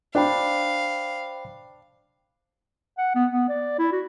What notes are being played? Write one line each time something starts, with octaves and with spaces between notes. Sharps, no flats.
D4 C5 F5 G5 B5
F#5
B3
B3
D5
E4
F#4